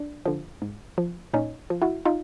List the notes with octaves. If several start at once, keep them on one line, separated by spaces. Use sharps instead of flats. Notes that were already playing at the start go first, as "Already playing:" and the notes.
Already playing: D4
D3 F3
G#2
F3
A#2 C#4 D#4
F3
E4 F#4
D#4 F4